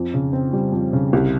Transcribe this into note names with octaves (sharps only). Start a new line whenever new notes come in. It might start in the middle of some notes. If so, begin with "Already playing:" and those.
Already playing: F2
C#3
C4
G3
F2
C#3
C2